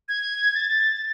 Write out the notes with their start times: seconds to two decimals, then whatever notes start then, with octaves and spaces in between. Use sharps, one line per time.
0.09 G#6
0.55 A6